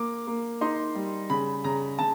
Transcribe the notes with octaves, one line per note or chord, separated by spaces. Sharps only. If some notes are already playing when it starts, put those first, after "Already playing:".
Already playing: A#3 D6
A#3
D#4 C6
G3
C#3 B5
C#3 A#5
C#3 A5